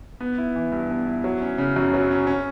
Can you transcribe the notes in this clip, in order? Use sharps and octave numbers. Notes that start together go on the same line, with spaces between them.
B3
E4
E3
G2
B3
E4
F#3
C#4
C#3
F#2
F#3
C#4
C#4